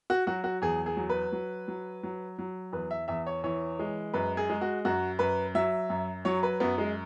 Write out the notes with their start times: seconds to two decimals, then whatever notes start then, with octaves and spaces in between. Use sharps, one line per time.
0.10 F#4
0.27 F#3 F#4
0.44 F#4
0.62 E2 G#4
0.86 G#4
0.97 F#3
1.10 B4
1.32 F#3
1.68 F#3
2.03 F#3
2.39 F#3
2.73 E2 B4
2.91 E5
3.08 E2 E5
3.27 C#5
3.44 E3 C#5
3.79 G#3
4.14 F#2 B4
4.37 G#4
4.50 G#3
4.61 F#4
4.85 F#2 F#4
5.19 F#2 B4
5.55 F#3 E5
5.90 F#2
6.25 F#3 C#5
6.43 B4
6.60 F#2 B3
6.78 G#3